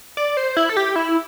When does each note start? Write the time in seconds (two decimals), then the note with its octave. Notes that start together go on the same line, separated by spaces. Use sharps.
0.17 D5
0.37 C5
0.57 E4
0.69 A4
0.77 G4
0.96 E4